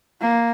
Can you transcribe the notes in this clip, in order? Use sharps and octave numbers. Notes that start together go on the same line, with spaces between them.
A#3